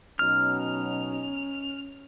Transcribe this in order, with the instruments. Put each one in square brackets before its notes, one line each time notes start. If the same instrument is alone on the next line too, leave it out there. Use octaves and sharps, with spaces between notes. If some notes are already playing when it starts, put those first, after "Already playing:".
[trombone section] B2 F#3 D#4 [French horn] C#4 [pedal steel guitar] F6